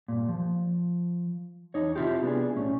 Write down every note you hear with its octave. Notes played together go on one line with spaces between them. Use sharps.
G2 A#2
F3
E2 D#4 C#5
C3 E4 F4 G4
B3 D4 G#4
B1 A2 C#4